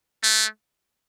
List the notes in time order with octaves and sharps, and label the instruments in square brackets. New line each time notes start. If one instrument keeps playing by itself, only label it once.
[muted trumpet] A3